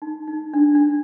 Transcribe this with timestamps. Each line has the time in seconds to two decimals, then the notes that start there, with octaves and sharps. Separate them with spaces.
0.02 D#4
0.27 D#4
0.53 D4
0.75 D4